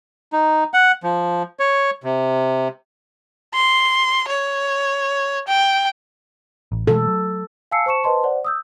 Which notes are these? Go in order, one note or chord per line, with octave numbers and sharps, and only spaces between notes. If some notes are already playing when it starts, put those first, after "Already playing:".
D#4
F#5
F3
C#5
C3
C6
C#5
G5
A1
B2 E3 G#3 A4
F#3
F5 G#5 A5 E6 C7 C#7
C5 A5 C#6 C#7 E7
B4 C5 D#5 A5 C6
C5 D5 F#5
D#6 E6 G6